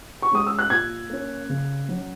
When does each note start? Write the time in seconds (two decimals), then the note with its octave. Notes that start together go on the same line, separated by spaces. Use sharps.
0.22 C#6
0.31 G#3 C#4 D#6
0.47 E6
0.59 F#6
0.70 A#2 G#6
1.10 A#3 C#4
1.49 C#3
1.88 F#3 C#4